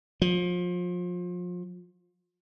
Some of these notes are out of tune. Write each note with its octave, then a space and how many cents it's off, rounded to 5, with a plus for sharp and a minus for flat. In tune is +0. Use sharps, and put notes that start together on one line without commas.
F3 +30